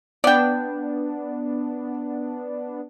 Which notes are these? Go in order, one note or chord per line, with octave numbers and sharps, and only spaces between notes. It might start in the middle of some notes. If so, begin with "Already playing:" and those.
B3 D4 D5 G5